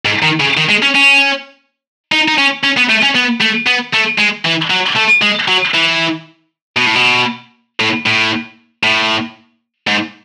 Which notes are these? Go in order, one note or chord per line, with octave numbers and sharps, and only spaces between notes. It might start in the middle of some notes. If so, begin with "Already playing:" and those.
G#2
D#3
C#3
D#3
G#3
C#4
C#4
D#4
D#4
C#4
C#4
B3
A3
C#4
B3
A3
B3
A3
G#3
E3
F#3
A3
G#3
F#3
E3
B2
A2
B2
A2
A2
A2
G#2